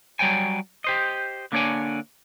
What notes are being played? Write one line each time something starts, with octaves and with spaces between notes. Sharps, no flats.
F#3 G3 C#5 G5 G#5
G4 C5 D#5
D3 A#3 D4 C#5 D5 G#5